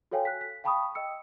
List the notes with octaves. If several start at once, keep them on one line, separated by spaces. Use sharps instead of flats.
F#4 A4 C#5 F5 G5 G#5
F#6 B6
B6
F5 G5 A5 B5 C#6 D#6
D#5 G5 E6 C#7